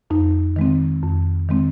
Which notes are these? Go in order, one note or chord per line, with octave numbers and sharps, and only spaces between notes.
F2 D#4
D#3 G#3 C4
F2
D#3 G#3 C4